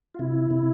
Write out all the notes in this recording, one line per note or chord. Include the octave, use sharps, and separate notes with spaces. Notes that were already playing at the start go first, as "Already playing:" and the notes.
F4
C3 E4
C3